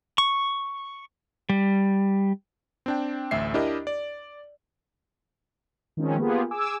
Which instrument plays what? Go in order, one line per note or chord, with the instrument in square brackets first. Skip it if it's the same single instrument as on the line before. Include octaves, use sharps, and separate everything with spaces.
[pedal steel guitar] C#6
G3
[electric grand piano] C4 D4 G5
A1 D2 E5 C7
D4 E4 G4 A#4 D#5
D5
[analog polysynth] D#3 F3 G#3 C4 C#4
A#3 B3 F4 G4 G#4
G#4 G#5 D6 E6